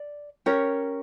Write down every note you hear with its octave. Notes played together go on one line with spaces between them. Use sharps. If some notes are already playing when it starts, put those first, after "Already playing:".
Already playing: D5
C#4 G4 A#4 C#5